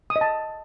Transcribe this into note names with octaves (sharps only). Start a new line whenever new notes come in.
D#6
D#5
A5